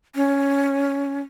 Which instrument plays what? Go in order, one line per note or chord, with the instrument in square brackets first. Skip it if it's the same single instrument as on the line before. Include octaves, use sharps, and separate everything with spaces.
[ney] C#4